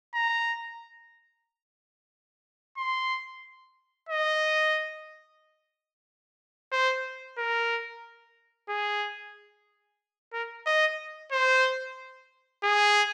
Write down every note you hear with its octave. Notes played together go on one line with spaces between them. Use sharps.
A#5
C6
D#5
C5
A#4
G#4
A#4
D#5
C5
G#4